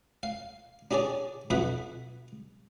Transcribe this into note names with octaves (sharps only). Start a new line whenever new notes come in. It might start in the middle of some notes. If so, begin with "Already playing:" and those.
F5
D4 G4 G#4 C#5 D5
B1 F2 B2 E5 F#5